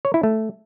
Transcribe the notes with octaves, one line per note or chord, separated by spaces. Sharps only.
C#5
E4
A3